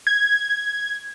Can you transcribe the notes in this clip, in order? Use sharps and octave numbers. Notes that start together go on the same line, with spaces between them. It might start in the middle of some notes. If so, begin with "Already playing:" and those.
G#6